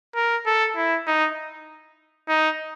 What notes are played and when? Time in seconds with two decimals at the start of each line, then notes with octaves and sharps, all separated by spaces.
0.16 A#4
0.46 A4
0.77 E4
1.07 D#4
2.28 D#4